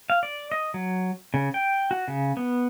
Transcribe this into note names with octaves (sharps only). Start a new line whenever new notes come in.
F5
D5
D#5
F#3
C#3
G5
F#4
C#3
B3